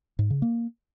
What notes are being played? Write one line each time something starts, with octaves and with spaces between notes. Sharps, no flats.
G#2
C#3
A#3